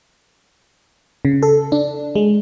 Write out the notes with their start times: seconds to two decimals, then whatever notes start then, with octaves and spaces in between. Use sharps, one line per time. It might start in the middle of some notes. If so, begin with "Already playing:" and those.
1.25 C#3
1.43 A4
1.72 D4
2.15 G#3